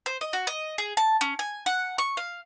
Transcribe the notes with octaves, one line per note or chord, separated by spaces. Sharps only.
C5
D#5
F#4
D#5
G#4
A5
C#4
G#5
F#5
C#6
F5